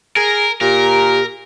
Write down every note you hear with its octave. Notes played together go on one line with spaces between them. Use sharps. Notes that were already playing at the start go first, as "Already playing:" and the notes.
G#4 A#4
A#2 G4 A#4